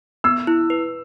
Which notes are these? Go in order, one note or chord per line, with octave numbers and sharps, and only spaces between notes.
B3 E6
E4
B4